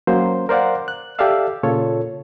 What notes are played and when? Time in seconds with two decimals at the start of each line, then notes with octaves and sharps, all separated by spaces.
0.07 F#3 A#3 C#4 C5
0.49 A#4 C5 D5 F5 F#5
0.88 F#6
1.18 G4 A4 D5 E5 F5 E6
1.63 A#2 C#3 F4 A4 C#5